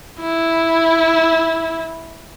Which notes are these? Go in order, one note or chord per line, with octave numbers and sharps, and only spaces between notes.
E4